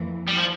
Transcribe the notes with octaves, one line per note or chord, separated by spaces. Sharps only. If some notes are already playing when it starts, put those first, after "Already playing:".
Already playing: F2 E3 A#3
G3
F3